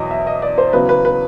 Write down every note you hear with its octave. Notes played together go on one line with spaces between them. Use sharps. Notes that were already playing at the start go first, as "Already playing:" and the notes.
Already playing: E2 B2 F#3 D#5
E5
D#5
D5
C5
E2 C#3 F#3 B4
B4
B4